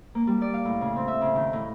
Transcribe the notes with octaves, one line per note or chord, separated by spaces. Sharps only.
A#3
G3
D5
F5
A2
C#3
C4
E5
C#3
D#3
A2